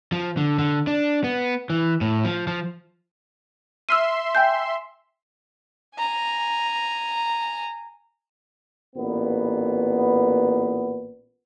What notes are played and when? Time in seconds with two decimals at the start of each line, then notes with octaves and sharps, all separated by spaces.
0.12 F3
0.37 D3
0.59 D3
0.87 D4
1.24 B3
1.70 E3
2.01 A2
2.25 F3
2.47 F3
3.89 E5 C6 E6 F6 D#7
4.35 G5 G#5 G6
5.96 G#5 A#5
8.96 A1 A#2 B3